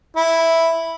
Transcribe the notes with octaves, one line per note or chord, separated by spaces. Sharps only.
E4